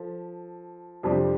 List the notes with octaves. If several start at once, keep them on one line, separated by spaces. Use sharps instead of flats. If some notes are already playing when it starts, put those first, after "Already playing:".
Already playing: F3 A4
F2 C3 G3 D4 G4